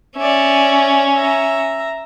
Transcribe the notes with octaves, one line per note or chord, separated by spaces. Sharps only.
C#4 D5 E5
E5 A#5